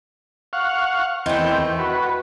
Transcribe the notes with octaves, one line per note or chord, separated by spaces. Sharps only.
F5 F#5 C#6
E2 D#3 A3 C4 G5
F#4 B4